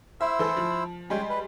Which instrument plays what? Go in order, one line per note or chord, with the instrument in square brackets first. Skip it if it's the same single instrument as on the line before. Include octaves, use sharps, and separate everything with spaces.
[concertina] E4 C5 E6 [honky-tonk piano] E5
[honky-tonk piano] E3 A4
F3
[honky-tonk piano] G3 G#3 C6 [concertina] C#4 G5 G#5
[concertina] B4